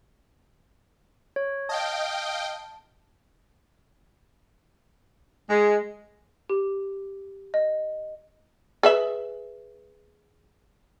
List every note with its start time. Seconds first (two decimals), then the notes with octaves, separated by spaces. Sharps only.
1.36 C#5
1.69 D#5 F5 G5 A5
5.50 G#3
6.49 G4
7.54 D#5
8.83 G#4 B4 E5